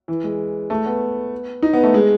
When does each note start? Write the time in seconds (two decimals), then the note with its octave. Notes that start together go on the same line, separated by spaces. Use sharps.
0.08 E3
0.24 G#3
0.70 A3
0.85 B3
1.62 D#4
1.73 B3
1.83 A3
1.94 G#3